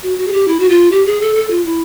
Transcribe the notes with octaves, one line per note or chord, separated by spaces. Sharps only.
F#4
F#4
G#4
G4
E4
F#4
F4
G4
G#4
A4
A4
F4
E4